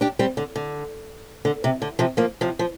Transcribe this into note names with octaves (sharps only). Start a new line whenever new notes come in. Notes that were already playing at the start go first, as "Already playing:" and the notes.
D4 G4
G3 C4
D3
D3
D3
C3
D3
C3 F3
F3 A#3
C3 F3
F3